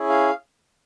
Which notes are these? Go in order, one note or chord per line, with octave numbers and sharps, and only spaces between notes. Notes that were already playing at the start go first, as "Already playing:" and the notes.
Already playing: C#4 E4 G#4
F5